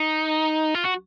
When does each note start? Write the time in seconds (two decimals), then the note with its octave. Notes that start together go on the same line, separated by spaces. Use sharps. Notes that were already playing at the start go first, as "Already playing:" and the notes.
Already playing: D#4
0.75 F4
0.84 F#4